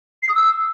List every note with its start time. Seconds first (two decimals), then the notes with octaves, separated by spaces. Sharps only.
0.23 C7
0.29 D#6
0.35 E6